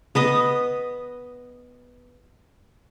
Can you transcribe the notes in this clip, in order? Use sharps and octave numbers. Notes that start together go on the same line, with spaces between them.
B3 B4 D#5